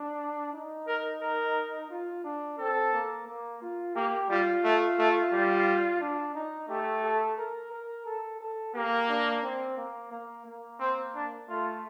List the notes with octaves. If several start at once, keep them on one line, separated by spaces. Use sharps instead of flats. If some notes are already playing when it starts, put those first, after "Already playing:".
Already playing: D4
D#4
A#4
A#4
F4
D4
C4 A4
A#3
A#3
F4
A#3 G4
G3 F4
A3
A3
G3
D4
D#4
A3 G4
A4
A#4
A#4
A4
A4
A#3 G4
D4
C4
A#3
A#3
A#3
C4
D4
A3 F4